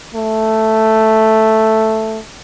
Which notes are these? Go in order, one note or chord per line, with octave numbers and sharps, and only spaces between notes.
A3